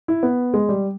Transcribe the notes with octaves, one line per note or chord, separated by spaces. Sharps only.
E4
B3
G#3
G3